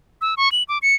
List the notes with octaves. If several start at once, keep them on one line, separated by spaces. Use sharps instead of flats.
E6
C#6
F#7
D6
C#7